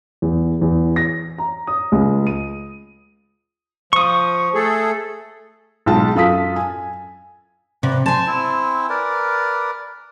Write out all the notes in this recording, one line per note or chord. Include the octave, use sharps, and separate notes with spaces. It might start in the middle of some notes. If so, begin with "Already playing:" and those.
E2
E2
A#6
A#5
D#6
C#2
D#7
F3 C#6 D#6
A3 G#4 A4
B1 G#3 F4 A5
F#2 F4 A4 F5 D#6 B6
G#5
C3 B4 D5 F#5
C5 G#5 A5
C4 E4
A#4 B4 D5